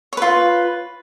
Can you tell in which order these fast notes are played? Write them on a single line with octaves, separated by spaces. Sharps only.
C#5 B4 F4